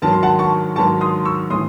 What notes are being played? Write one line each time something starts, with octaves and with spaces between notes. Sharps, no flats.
G#2 D#3 F#3 A5
C6
F#5 A5
A5 C#6
G#2 D#3 F#3 A5 C#6
C6 D#6
C#6 E6
A2 E3 C6 D#6